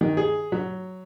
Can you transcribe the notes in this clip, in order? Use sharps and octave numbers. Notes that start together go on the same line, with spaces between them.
D#3
G#4
F#3